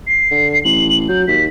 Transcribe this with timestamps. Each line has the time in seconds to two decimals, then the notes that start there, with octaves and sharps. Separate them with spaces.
0.07 C7
0.31 D3
0.64 A1 F#7
1.09 F#3 G6
1.27 D#2 B6